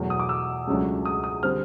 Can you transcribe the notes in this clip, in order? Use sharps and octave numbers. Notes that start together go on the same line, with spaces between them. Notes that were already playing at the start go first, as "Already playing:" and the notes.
Already playing: E2 B2 F#3 A3
D#6
D6
E6
C#2 C#3 F#3 A3 D4
D#6
D#6
D3 G3 C4 F6